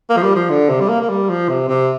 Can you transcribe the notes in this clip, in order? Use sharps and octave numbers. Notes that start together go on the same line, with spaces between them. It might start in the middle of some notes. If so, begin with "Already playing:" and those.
A#3
F3
G3
F3
D3
C3
G3
A#3
A#3
G3
F3
C3
C3